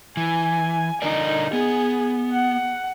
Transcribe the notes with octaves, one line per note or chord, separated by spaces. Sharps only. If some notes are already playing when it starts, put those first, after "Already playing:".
E3 G#5
D3 D#4 A#4 D5
B3 G#4
F#5